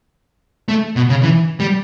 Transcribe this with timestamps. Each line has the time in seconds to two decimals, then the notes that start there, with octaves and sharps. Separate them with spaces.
0.69 A3
0.96 B2
1.09 C#3
1.23 E3
1.60 G3